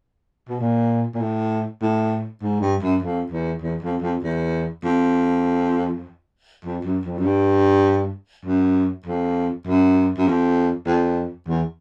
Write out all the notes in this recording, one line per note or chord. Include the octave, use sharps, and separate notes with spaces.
B2
A#2
A#2
A2
A2
G#2
G2
F#2
F2
E2
E2
F2
F2
E2
F2
F2
F#2
F2
F#2
G2
F#2
F2
F#2
F#2
F2
F2
E2